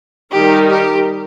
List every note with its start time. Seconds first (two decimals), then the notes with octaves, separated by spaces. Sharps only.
0.32 D#3 G3 D#4 G4 A#4
0.70 G4